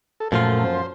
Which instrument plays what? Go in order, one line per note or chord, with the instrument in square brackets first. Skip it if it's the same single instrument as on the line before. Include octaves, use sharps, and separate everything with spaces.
[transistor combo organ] A4
[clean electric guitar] F#2 F3 F4 [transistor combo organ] A#2 A3
[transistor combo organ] C5